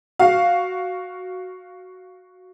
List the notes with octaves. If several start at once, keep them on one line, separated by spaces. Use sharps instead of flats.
F#4 F5